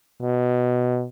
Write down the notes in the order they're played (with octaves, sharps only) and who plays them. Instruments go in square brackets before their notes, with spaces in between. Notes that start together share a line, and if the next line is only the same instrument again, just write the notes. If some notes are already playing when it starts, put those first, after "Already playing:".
[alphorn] B2